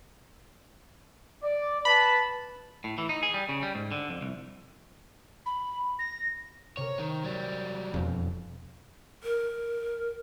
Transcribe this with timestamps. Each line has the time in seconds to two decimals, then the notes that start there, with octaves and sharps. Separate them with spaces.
1.42 D5
1.85 B4 A5 B5
2.84 A2
2.98 E3
3.09 D#4
3.23 G#4
3.34 G3
3.49 C#3
3.63 G3
3.75 G#2
3.92 D3
4.10 F2
4.21 C2
5.46 B5
5.99 A#6
6.77 C3 A#4 C#5
6.99 D#3
7.24 F#3 G3
7.94 E1 F2
9.23 A#4